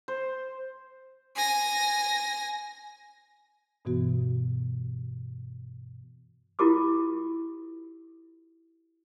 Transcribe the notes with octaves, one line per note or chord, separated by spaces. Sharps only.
C5
G#5 A#6
G2 B2 E3 B3 F#4
E4 F4 G4 A#4 D6 D#6